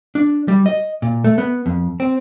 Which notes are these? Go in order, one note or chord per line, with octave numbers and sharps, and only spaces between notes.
D4
G3
D#5
A#2
A3
B3
F2
C4